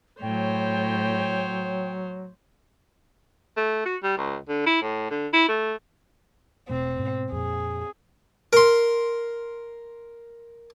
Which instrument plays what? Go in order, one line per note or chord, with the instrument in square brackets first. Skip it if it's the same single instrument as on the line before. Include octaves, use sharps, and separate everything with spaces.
[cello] A2 [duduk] F#3 [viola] C5 C#5 [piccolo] G5
[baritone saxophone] A3
F#4
G3
C#2
D3
E4
A2
D3
E4
A3
[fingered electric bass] E1 B2 A3 [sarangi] C4
[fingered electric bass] G#2 B2
[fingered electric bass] F2 A#2 [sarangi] G#4
[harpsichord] A#4 C6